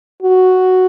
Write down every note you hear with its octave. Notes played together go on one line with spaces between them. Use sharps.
F#4